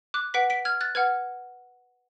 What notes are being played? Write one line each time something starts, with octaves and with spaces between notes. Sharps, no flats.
D6 F#6
B4 F#5 B6 D7
B6 D7
F6 G#6
F#6 A6
B4 F#5 F6 G#6